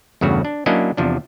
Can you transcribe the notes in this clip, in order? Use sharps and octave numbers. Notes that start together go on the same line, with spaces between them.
E2 G2 C#3 A3 F#4
D4
F#3 A#3 C#4 D4 E4 D#5
E2 C3 F3 D4